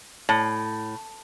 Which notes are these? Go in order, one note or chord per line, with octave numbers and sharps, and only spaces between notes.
A2